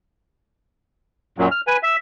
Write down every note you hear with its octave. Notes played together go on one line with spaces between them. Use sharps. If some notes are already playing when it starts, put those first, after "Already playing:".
F#2 A#2 F#3
F6
B4 G#5
E5